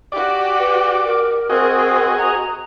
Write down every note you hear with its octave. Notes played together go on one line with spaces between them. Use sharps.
F#4 G4 D5
B4
A#4
C4 F#4 G#4 D#5
A#5